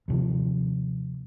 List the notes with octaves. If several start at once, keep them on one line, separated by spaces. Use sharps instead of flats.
D#2 C3 F3